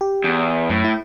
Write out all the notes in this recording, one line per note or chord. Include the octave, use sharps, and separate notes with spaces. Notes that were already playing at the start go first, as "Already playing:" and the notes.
G4
E2
F#2 A2
E4